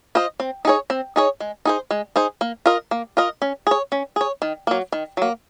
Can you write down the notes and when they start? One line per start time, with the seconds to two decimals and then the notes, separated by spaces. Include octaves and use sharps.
0.15 F4 C5 D#5
0.40 C4
0.65 D#4 G#4 C#5
0.90 C4
1.16 D#4 G#4 C#5
1.40 G#3
1.65 D#4 G#4 C5
1.91 G#3
2.16 D#4 G#4 C5
2.41 A#3
2.66 F4 A#4 D#5
2.91 A#3
3.17 F4 A#4 D#5
3.42 C#4
3.67 G#4 C#5
3.92 C#4
4.16 G#4 C#5
4.42 D#3
4.67 F#3 A#3
4.92 D#3
5.17 F#3 A#3